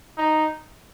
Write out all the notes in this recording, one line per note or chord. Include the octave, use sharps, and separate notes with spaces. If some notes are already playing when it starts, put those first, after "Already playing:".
D#4